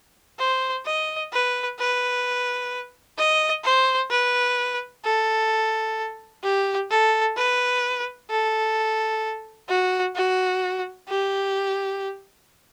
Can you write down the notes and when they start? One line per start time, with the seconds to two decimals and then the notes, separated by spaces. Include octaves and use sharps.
0.39 C5
0.86 D#5
1.33 B4
1.79 B4
3.18 D#5
3.64 C5
4.11 B4
5.04 A4
6.43 G4
6.90 A4
7.37 B4
8.30 A4
9.69 F#4
10.15 F#4
11.08 G4